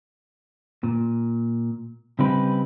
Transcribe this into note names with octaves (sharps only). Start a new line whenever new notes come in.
A#2
C#3 G3 C4 D#4 G4 B4